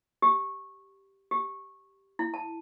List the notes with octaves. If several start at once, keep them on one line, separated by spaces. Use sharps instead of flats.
G4
G4
E4
A5